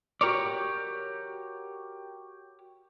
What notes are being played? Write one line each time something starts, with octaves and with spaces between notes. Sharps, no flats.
F#4 G4 A#4 C#5 D5